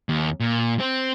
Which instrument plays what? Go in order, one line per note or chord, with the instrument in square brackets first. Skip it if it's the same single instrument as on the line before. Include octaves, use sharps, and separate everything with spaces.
[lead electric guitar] D#2
A#2
C4